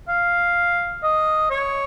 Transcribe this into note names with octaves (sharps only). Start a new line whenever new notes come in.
F5
D#5
C#5